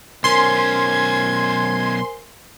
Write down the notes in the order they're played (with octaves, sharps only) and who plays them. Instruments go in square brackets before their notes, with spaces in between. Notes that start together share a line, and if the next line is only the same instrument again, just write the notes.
[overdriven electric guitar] B1 C#4 [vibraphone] A#4 C5 G#5 [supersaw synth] C6 [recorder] G#6